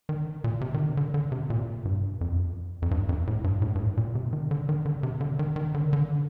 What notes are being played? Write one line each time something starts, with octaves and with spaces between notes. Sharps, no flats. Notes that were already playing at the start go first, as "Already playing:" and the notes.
D#3
A#2
C3
D#3
D3
D3
D3
C3
A#2
C3
A#2
G2
F2
F2
G2
F2
A2
G2
A2
G2
A2
A#2
C3
D#3
D3
D#3
D3
C3
D3
D#3
D#3
D3
D#3
D3